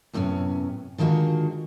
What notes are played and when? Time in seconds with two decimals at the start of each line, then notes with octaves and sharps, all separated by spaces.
0.13 F#2 A2 C3 B3 C#4
0.98 D3 D#3 G#3 F4 F#4